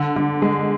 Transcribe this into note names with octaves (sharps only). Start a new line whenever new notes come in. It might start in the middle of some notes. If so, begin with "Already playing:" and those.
Already playing: D3
D3
G#3